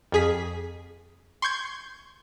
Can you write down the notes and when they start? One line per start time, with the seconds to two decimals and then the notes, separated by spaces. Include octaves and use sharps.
0.12 F2 G#4 B6
1.42 C6 C#6 G6 G#6